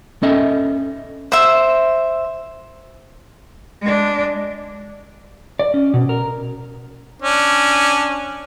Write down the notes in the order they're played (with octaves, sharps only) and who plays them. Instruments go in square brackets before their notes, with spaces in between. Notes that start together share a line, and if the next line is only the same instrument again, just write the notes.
[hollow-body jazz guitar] C#4 A4 D#5 E5
[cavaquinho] C5 E5
[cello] G#3 D4
[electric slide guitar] D5
C#4
B2
A#4
[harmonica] C#4 D4